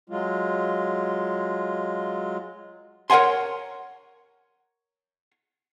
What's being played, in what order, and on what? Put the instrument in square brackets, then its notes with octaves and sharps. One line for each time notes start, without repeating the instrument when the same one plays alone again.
[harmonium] F#3 G#3 F4
[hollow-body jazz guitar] A#4 C#5 F#5 G#5 C6